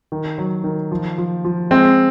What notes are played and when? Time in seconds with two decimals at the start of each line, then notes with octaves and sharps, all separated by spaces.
0.12 D#3
0.38 F#3
0.64 D#3
0.92 F3
1.18 F3
1.44 F3
1.71 G#3 C4